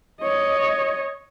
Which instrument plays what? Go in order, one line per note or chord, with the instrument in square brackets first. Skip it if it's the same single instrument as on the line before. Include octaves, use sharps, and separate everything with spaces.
[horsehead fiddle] C#5 D#5